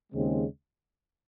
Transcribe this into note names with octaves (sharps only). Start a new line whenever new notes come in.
D#2 C#3 G#3 C4